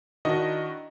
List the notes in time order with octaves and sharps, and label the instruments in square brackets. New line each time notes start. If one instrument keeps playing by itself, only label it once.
[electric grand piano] D#3 D4 E4 F#4 D#5